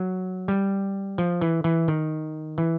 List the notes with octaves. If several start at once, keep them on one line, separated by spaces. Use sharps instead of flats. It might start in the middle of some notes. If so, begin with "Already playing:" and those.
Already playing: F#3
G3
F3
E3
E3
D#3
E3